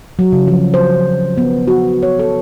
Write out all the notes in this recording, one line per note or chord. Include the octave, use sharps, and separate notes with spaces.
F#3
C#3
F3
C5
B3
F#4
C#5
A4